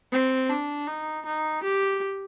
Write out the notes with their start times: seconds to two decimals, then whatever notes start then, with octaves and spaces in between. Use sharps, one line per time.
0.12 C4
0.50 D4
0.87 D#4
1.26 D#4
1.63 G4